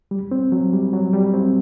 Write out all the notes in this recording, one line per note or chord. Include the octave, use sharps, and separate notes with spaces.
G3
C4
F#3
G3
F#3
G3
C4